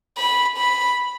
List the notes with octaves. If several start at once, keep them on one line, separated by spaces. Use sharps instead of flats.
B5
B5